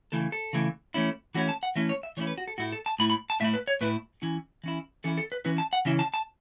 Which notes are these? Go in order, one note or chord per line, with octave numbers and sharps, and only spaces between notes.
C#3 E3 A3 E4 A4
A4
C#3 E3 A3 E4
E3 A3 C#4 E4
E3 A3 C#4 E4 F#4
A5
F#5
E3 A3 C#4 E4 E5
C#5
E5
E3 A3 C#4 E4 C#5
B4
F#4
A4
A2 A3 E4 F#4
A4
A5
A2 A3 E4 B5
B5
A5
A2 A3 E4 E5
B4
C#5
A2 A3 E4 B4
E3 C#4 E4
E3 C#4 E4
E3 C#4 E4 A4
A4
B4
E3 C#4 E4 B4
A5
F#5
C#3 E3 C#4 E4 E5
A5
A5